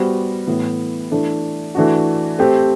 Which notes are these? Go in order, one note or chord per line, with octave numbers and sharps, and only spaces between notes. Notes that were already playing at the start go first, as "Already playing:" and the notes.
Already playing: G3 B3 F#4 C5
A2 E3 B3
E3 A3 D4
E3 A3 D4 F#4
A3 C4 G4